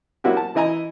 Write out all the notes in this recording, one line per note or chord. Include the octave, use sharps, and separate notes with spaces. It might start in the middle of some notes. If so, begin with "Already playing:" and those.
F#3 A#3 E4 F#4 G4
A5
E3 E4 D#5 G#5 A#5